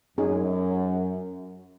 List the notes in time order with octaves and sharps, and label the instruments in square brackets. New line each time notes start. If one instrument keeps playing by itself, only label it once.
[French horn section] F#2 [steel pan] C#4 D#4 G#4